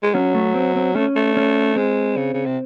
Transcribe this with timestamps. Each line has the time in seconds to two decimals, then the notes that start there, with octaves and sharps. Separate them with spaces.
0.03 G#3
0.14 F#3 C#4
0.34 A3
0.55 C4
0.76 C4
0.95 A3 C#4
1.16 A3
1.37 C#4
1.76 G#3 C4
2.17 C#3
2.34 C#3
2.46 C3